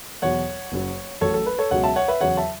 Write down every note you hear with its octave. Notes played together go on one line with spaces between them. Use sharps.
E2 B2 F#3 C#5 F#5
F#1 F#2 F#3
A1 A2 F#3 A4 C#5
A4
B4
A4 C#5
C#2 B2 F#3 C#5 F#5
E5 A5
C#5 F#5
B4 E5
E2 C#3 F#3 C#5 F#5
E5 A5